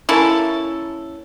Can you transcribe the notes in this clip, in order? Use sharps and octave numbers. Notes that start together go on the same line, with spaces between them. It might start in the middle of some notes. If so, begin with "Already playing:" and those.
A#3 C#4 E4 A4